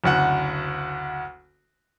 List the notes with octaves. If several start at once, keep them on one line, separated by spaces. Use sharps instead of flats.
F#1 D2 F#5